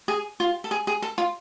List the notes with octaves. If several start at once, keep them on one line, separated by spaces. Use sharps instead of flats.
G#4
F4
A4
G#4
G#4
A4
F4